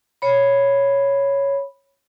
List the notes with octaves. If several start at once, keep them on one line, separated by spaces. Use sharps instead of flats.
C#5 B5